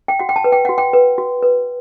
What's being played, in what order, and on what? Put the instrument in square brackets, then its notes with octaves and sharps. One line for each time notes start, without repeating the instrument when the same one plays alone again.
[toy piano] G5
F#4 F#5
G5
A5
B4
G5
F#4 F#5
G5
B4
F#4
B4